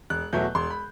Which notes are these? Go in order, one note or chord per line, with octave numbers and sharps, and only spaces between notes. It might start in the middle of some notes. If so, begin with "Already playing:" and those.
E1 F#6
E2 B2 F#3 A3 G6
E1 C6
B5